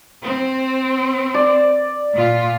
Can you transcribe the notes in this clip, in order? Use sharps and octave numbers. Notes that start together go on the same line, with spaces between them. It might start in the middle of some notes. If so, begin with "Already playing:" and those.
C4
D5
A#2 F4